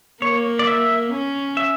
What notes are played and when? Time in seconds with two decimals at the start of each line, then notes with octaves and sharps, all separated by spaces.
0.22 A#3 C#5
0.59 D5
0.67 E5
1.12 C#4
1.57 E5